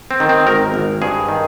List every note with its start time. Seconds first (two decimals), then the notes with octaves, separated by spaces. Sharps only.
0.11 C4
0.20 D#3
0.29 C4
0.47 G#1 A#4
0.74 G#1
1.02 G2 G#4
1.29 D#3